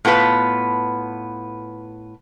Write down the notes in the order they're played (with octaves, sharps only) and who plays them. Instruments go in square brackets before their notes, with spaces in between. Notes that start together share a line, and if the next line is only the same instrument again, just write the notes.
[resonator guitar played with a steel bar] A2 B3 F4 B4 A5